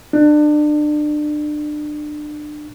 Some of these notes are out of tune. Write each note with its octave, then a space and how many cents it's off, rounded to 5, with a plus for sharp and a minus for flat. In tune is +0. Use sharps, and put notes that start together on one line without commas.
D4 +30